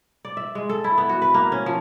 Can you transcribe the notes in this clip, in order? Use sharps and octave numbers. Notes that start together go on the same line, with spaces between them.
D5
E5
G#3
A4
E4
B3
F#4
B4
A#3
C#4
F3